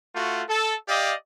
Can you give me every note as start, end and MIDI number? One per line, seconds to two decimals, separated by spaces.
0.15 0.43 57
0.15 0.43 65
0.15 0.43 66
0.49 0.74 69
0.88 1.13 67
0.88 1.13 74
0.88 1.13 75
0.88 1.13 77